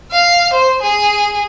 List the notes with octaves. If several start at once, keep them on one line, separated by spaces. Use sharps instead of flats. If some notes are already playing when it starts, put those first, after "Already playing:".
F5
C5
G#4